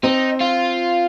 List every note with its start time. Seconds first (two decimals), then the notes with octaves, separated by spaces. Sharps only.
0.03 C4 D#4
0.41 F4